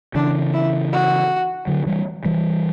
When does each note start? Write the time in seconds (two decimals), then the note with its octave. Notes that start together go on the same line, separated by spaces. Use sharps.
0.15 C#3 E3 D4
0.53 E4
0.92 F#4
1.67 D3 F#3
1.86 E3 G3
2.25 E3 G3